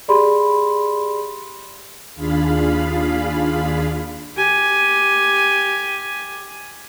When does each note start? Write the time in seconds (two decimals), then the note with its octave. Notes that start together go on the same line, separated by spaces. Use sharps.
0.08 G4 G#4 D5 B5 C6
2.15 D#2 D4 F4 G#4 F5 B5
4.37 G4 G#5